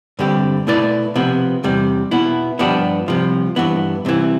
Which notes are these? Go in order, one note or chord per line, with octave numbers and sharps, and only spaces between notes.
G2 D3 G3 C4 G4
B2 A3 E4 B4 D5
C3 F3 B3
E2 C3 G3
B2 B3 E4
G2 F3 B3 D4 G4
C2 C3 F3
G2 E3 B3
C2 C3 E3